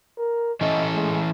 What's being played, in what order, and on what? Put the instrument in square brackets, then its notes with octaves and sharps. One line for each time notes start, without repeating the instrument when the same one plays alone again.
[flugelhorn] A#4
[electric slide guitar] E3 C#4 A4 [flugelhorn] D#5
[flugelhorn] G#3